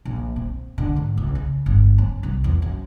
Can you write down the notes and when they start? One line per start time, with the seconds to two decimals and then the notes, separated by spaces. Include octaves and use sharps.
0.05 A#1
0.36 C4
0.78 D3
0.96 G#2
1.17 C#2
1.35 C#3
1.66 G1
1.98 C#4
2.23 C2
2.44 E2
2.62 F#2